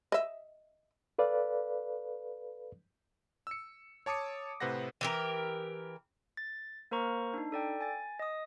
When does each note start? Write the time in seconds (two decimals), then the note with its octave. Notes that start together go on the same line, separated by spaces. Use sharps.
0.12 D#5 E5
1.18 A4 B4 D5 F5
3.47 E6 C#7
4.06 C#5 A5 D6 D#6 C#7
4.60 A2 C3 B4 C5 F#5 A#6
5.01 E3 G4 A#4
6.37 A6
6.91 A#3 A#4 C5 A#5 C#6
7.34 D4 D#4
7.52 A4 D5 G5
7.81 G#5 A6
8.19 D#5 D#6